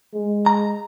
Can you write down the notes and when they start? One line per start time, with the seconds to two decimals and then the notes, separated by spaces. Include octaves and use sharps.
0.14 G#3
0.46 A#5